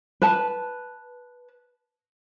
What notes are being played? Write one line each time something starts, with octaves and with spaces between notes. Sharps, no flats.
B4 A5